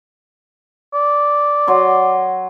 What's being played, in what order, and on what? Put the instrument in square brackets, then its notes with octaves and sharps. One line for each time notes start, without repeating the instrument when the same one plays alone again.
[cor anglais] D5
[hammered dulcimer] F#3 C6